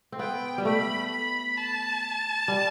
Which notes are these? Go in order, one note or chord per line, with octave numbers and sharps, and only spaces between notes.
C4
B3 G5
G3
A3 B5
B5
A5
G3